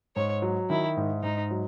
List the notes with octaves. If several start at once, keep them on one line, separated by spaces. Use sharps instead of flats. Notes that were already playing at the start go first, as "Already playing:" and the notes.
G#2 C#5
F#3
D#3 E4
G#2
G#2 D#4
F#3